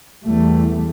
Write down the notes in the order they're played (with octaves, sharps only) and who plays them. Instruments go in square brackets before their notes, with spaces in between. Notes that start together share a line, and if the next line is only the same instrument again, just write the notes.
[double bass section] E2 E3 G3 A3